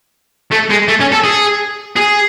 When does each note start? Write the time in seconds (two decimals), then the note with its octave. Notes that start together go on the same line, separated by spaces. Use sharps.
0.52 A3
0.70 G#3
0.88 A3
1.00 C#4
1.12 A4
1.24 G#4
1.96 G#4